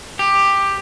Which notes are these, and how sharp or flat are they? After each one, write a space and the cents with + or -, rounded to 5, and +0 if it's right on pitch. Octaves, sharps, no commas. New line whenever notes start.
G4 +10